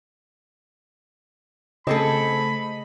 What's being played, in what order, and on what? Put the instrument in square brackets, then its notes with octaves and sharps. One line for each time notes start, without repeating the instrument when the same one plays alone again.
[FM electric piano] C#3 A3 [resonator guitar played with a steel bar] C4 G#4 A4 [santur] D#5 [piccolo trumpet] B5